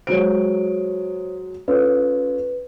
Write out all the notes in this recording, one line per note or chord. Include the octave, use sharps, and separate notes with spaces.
F#3 G#3 C5 C#5 D7
C#4 F4 A4 B4